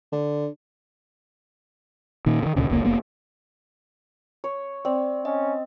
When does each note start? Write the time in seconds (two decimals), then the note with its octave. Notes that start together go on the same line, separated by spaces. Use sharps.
0.12 D3
2.26 A#2 D#3
2.43 C3 D#3
2.56 D2 A#2 C#3
2.69 F1 C#2 A2 A#3
2.84 F1 A#3 B3
4.44 C#5
4.85 C4 D5
5.25 C#4 D#5